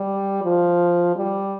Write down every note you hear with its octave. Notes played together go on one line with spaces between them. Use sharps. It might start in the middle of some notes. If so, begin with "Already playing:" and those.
Already playing: G3
F3
G3